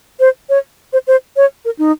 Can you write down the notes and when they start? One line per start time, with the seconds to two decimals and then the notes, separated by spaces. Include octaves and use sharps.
0.20 C5
0.49 C#5
0.93 C5
1.07 C5
1.36 C#5
1.65 A#4
1.79 D#4